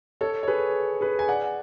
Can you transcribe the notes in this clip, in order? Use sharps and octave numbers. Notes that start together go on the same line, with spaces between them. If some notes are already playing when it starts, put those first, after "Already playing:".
A4 C#5
C#5
G#4 B4
G#4 B4
G#5
D5 F#5